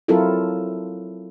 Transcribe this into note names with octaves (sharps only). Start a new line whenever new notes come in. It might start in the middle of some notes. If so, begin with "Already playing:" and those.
F#3 C4 E4 F4 A4 A#4